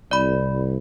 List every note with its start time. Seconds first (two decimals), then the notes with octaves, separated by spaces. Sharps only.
0.11 C2 D5 B5